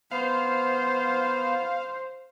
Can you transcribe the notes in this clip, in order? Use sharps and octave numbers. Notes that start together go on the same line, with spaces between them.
B3 C5 F5